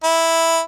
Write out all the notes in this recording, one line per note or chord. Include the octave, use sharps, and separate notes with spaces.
E4